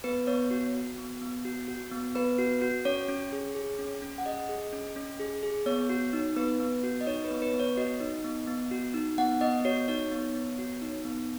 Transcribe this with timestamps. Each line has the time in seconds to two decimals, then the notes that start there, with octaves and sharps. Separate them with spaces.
0.04 B3 B4
0.27 B3 C#5
0.51 F#4
0.74 F#4
0.98 B3
1.22 B3
1.45 F#4
1.68 F#4
1.91 B3
2.15 B3 B4
2.39 F#4
2.62 F#4
2.85 C#4 C#5
3.08 C#4
3.32 G#4
3.55 G#4
3.79 C#4
4.02 C#4
4.18 F#5
4.26 G#4 D#5
4.49 G#4
4.73 C#4
4.96 C#4
5.20 G#4
5.43 G#4
5.66 B3 C#5
5.89 F#4
6.13 D#4
6.37 B3 B4
6.60 B3
6.83 F#4
7.01 D#5
7.07 D#4 C#5
7.24 B4
7.30 B3
7.42 B4
7.54 B3
7.60 C#5
7.77 F#4 D#5
8.01 D#4
8.24 B3
8.47 B3
8.71 F#4
8.94 D#4
9.18 B3 F#5
9.41 B3 D#5
9.65 F#4 C#5
9.88 D#4 C#5
10.12 B3
10.35 B3
10.58 F#4
10.82 D#4
11.05 B3